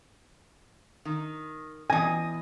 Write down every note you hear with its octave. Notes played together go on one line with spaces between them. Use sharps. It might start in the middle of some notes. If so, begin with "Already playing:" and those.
D#3
E2 D#5 G#5